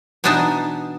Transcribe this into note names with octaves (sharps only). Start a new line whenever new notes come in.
B2 E3 B3 D4 D#4 A5